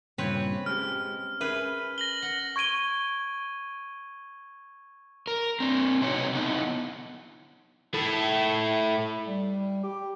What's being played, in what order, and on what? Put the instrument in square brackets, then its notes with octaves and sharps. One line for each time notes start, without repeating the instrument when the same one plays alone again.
[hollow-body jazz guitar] G2 A#2 C#3 [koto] C4 B4 C#5
[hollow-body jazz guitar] G#3 C#4 G4 [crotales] F6
[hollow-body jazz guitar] C#4 A#4 E5 [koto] G#4 B4
[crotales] A#6 F#7 G7
[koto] F#5
[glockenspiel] C#6 G#6 D7 D#7 G7
[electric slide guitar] A#4
C4 D4
C3 F#3 D#4 B4 C#5 G5
D3 B3 D#4 E4
[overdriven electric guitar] A3 E4
[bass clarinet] G3
G4